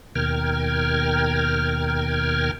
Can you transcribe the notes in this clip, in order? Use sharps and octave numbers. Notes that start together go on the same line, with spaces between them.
D#2 B2 A#4 G5 F6 G#6